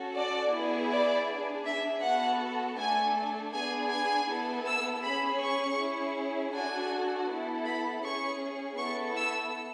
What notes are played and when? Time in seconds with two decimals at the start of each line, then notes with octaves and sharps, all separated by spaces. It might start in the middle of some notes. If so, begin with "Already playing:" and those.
Already playing: C#4 F#4 A4
0.16 D5
0.52 B3 E4 G#4
0.90 D5
1.28 D4 G#4
1.66 E5
2.03 B3 F#4 A4 F#5
2.78 A3 D4 A4 G#5
3.53 B3 D4 G#4 G#5
3.91 G#5
4.28 B3 E4 A4
4.66 E6
5.03 C#4 G#4 B5
5.41 C#6
5.79 C#4 E4 G#4
6.53 D4 F#4 A4 G#5
7.29 B3 E4 A4
7.66 B5
8.04 C#4 G#4 C#6
8.78 B3 E4 A4 C#6
9.16 E6